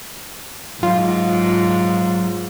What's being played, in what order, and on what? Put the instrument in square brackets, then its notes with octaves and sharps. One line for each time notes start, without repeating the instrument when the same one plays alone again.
[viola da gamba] G#2 [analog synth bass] F#3 [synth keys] F4